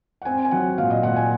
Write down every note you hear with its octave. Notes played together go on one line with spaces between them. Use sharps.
F#5
C4 G#5
G#5
F#3 F#5
A#2 F5
D#5
A#2 F#5
G#5